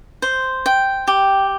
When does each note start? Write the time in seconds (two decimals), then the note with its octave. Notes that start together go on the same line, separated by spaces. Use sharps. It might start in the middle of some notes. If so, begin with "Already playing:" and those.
0.22 C5
0.66 G5
1.08 G4